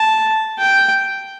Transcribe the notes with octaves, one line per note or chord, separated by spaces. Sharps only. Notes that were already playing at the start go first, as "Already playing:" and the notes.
Already playing: A5
G5